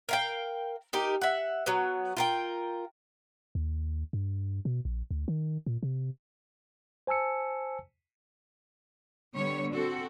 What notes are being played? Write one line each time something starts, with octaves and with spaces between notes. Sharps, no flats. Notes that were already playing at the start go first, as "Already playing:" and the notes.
A#4 F5 G5
D#4 G4 A#4
E5 F#5
F#3 B3
F4 A#4 G5
D#2
G2
B2
A#1
D2
D#3
A#2
C3
C5 G#5 A5 E6 C#7
D3 G3 B3 C#5
C4 F#4 A4